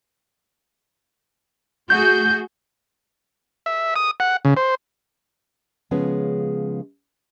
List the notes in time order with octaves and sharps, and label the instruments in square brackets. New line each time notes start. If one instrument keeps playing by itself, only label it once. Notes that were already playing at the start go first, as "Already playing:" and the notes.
[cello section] A3 F#4 G#4 [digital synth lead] G6
[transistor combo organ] E5
D#6
F#5
C#3
C5
[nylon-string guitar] C#3 F3 G#3 B3 C#4